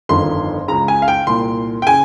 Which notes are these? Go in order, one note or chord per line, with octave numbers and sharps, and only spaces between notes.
G1 F2 D#3 C6
C#2 C#3 A#5
G#5
F5
G5
C2 A#2 C6
G5
C#3 G#5